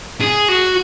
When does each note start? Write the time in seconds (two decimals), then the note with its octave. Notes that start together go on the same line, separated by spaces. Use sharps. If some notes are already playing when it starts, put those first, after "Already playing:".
0.21 G#4
0.49 F#4